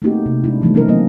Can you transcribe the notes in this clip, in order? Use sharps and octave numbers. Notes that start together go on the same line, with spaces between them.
A3 A#3 C4 D#4 F#4 G4
C3
G#3 D4 E4
C#3 E3 F3 G3 A3 D#4
A#3 B3 C#4 D#4 A#4
F#3 A#3 C4 D#5